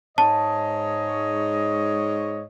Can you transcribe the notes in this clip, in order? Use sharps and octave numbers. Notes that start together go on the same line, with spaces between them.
G#2 C#5 D#5 A5